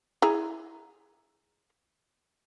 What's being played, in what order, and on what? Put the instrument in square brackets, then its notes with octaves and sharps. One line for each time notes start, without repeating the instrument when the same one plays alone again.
[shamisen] E4 G#4 A#5